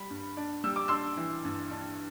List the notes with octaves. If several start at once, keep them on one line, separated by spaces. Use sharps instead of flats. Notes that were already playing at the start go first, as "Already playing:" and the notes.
Already playing: G3 B5
G2
D4
G3 E6
D6
D4 C6 E6
E3
G2
D4